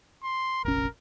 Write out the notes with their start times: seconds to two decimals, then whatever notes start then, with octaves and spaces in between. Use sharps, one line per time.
0.23 C6
0.65 F1 A#1 C#4 A#4